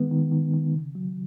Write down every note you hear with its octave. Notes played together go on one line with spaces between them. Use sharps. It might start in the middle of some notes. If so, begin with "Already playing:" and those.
Already playing: D#3 G#3 B3
D#3
D#3
D#3
C#3
F#3